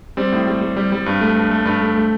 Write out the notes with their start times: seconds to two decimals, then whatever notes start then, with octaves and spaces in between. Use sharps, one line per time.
0.17 G3 C4
0.32 A2
0.47 G3
0.61 G3
0.76 G3
0.92 G3
1.06 G2
1.21 A3
1.36 G2
1.51 A3
1.65 G2
1.81 A3
1.96 A3